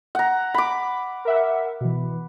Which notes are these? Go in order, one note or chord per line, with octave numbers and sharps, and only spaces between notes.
F#5 A#5
B5 D6
A#4 E5 F#5
B2 E3